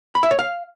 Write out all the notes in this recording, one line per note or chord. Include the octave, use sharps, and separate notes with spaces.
B5
E5
C#5
F5